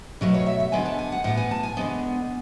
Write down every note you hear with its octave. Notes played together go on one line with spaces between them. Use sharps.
B2 F#3 A3 B4
C#5
E5
E5
D3 G#3 B3 G#5
A5
G#5
F#5
A2 E3 B3 F#5
G#5
A5
G#5
D3 G#3 B3